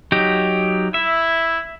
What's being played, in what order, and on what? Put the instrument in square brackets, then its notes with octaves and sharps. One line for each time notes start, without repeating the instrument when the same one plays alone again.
[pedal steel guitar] F#3 D#4 G4
[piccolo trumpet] E4 [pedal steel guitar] E5